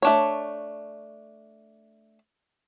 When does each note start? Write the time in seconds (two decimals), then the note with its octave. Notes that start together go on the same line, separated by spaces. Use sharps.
0.02 A3 D4 C#5